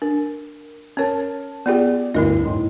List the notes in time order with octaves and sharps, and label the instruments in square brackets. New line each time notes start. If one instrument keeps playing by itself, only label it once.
[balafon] D4 [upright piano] A#4
[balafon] C#4 C#5 [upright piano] A#4 A5
[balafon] B3 F4 G5 [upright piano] G#4 D5
[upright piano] D2 G2 [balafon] E4 A#4 D#5
[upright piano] A2 D#4 C6